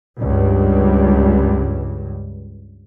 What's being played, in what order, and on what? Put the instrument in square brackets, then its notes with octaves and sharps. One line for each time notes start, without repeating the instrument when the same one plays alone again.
[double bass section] C#2 G2